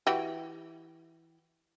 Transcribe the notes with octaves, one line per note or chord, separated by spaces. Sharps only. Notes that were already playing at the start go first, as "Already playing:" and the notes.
E3 F#4 G4